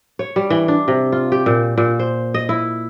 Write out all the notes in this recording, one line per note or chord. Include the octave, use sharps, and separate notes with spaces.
C#5
G3
E3
D4
C3
F4
G4
A#2
A#2
C5
D#5
E4